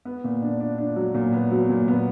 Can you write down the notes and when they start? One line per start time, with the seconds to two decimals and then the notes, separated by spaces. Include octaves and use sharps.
0.05 B3
0.24 A#2
0.42 D4
0.60 D4
0.78 D4
0.96 F#3
1.14 A#2
1.33 B3
1.51 F#3
1.69 A#2
1.88 B3